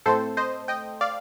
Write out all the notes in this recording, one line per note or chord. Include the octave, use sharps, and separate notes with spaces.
A2 A3 C4 A4 C5
C5 D#5
D#5 G5
D5 F5